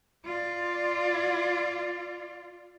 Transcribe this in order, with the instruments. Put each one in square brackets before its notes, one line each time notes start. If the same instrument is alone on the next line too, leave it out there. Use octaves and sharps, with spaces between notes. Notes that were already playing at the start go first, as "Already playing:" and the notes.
[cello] F4 D5